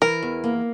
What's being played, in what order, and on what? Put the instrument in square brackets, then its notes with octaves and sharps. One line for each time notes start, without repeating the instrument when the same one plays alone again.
[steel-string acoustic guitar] E3 [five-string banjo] A#4
[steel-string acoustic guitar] E2
A#3